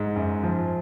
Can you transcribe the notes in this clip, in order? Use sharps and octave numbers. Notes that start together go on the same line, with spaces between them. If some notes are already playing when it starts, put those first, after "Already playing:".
Already playing: G#2
F#2
F3